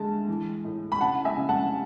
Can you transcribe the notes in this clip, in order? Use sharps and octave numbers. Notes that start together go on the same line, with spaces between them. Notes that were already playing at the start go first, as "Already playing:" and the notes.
Already playing: D2 G#3 A5
E3
A2
B5
C#3 F#5 A5
E5 G#5
C#3
F#5 A5